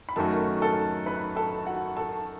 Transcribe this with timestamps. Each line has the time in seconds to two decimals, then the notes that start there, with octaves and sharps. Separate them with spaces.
0.09 B5
0.16 F#2 D#3 A3 C#4 F#4 A4 A5
0.62 A4 A5
1.06 B4 B5
1.36 A4 A5
1.66 F#4 F#5
1.97 A4 A5